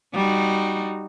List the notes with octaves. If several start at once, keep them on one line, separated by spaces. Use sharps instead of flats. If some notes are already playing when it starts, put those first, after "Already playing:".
G3 D#4 F#4